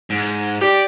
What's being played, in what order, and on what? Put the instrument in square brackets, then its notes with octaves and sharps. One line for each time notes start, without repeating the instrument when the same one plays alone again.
[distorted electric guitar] G#2
[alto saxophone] G4 [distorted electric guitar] D5